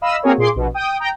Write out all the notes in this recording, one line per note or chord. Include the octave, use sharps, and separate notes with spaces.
D#5 F5 B5 E6
A#3 C4 F#4 G#4 A#4 C#5
A#2 G#4 C6 D6
A#1 B2
G5 D#6
G5 A#5